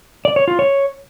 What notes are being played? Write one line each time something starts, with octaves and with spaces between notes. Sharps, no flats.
D5
C#5
F4
C#5